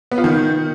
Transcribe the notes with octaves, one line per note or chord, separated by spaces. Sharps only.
B3
F4
D#3